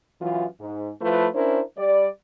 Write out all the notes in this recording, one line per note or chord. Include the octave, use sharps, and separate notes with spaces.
F#2 E3 F4
G#2
F3 A3 E4 F4 B4
C#4 D4 E4 A#4 C5
G3 D5